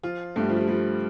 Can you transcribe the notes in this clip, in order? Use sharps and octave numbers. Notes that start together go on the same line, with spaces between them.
F3 F4
G2 A3
G3
F3
G3
F3 G3